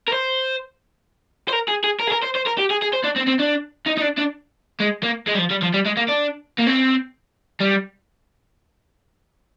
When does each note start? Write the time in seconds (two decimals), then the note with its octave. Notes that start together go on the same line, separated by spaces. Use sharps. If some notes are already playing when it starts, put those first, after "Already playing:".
0.08 A#4
0.12 C5
1.49 C5
1.53 A#4
1.69 G#4
1.84 G#4
2.00 A#4
2.07 G#4
2.11 A#4
2.23 C5
2.35 C5
2.46 A#4
2.58 G4
2.70 G#4
2.82 G#4
2.94 C5
3.05 D4
3.17 C4
3.28 C4
3.40 D4
3.87 D#4
3.98 D#4
4.02 D4
4.18 D4
4.80 G#3
5.03 A#3
5.27 G#3
5.34 G3
5.38 F3
5.50 G3
5.62 F3
5.73 G3
5.85 G#3
5.97 A#3
6.08 D4
6.58 A#3
6.67 C4
7.61 G3